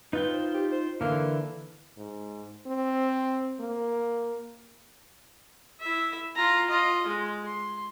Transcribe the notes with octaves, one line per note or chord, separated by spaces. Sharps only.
D#4 F4 B4 G5
C5
G4
C5
D3 E3 A#3
G#2
C4
A#3
E4 E5
F4 A#5
F4 D#5
G#3
C6